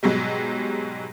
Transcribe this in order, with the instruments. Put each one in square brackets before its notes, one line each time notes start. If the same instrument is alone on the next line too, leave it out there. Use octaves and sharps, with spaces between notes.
[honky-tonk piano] G#2 B2 F#3 G3